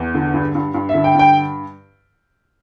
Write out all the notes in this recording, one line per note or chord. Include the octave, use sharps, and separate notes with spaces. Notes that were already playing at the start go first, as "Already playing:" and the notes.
Already playing: E2
D3
G2
G2
G2
E5
D3
G5
G2 G5